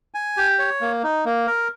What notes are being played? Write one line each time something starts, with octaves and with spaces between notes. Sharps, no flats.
G#5
G4
C#5
A#3
D#4
A#3
A#4